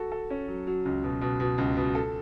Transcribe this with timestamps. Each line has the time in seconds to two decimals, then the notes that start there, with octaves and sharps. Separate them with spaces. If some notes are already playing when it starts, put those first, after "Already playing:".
Already playing: F#4 A4
0.12 A4
0.30 C#4
0.48 F#3
0.67 F#3
0.85 C#2
1.03 B2
1.21 B2
1.40 B2
1.58 C#2
1.77 B2
1.95 A4